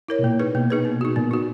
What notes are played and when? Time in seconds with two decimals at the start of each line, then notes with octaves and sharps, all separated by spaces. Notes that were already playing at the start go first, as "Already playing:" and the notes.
0.08 E4 A#4 C#5
0.19 B2
0.23 A#2 A#3
0.40 D#4 G#4 B4
0.55 B2 A#3
0.70 D#4 G#4 B4
0.85 B3
1.01 D#4 F#4
1.16 A#2 B3
1.31 D#4 F#4